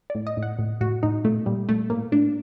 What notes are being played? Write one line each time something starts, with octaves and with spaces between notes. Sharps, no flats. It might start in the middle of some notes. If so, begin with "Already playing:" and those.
D5
A2
D#5
A2
F#5
A2
A2 F#4
A2 D#4
A#2 A3
A#2 G3
A#2 A3
A2 A#3
A2 D4